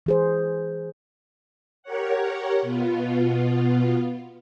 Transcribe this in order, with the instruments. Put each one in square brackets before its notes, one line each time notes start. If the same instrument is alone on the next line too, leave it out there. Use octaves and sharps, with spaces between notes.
[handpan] E3 G#4 C5
[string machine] G4 A#4 C#5 F#5
B2 B3 F4